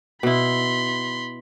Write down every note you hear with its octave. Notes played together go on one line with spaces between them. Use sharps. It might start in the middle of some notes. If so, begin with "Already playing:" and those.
B2 E4 B5 C6